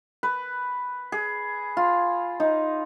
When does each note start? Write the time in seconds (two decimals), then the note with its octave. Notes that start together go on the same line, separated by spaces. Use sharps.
0.23 B4
1.12 G#4
1.77 F4
2.40 D#4